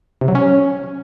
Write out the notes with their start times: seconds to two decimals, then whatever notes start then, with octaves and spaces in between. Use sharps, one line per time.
0.21 C3
0.28 F#3
0.35 C#4